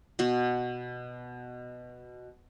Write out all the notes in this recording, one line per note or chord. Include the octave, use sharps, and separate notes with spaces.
B2 F#4